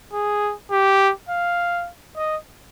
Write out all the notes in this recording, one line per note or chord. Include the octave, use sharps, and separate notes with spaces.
G#4
G4
F5
D#5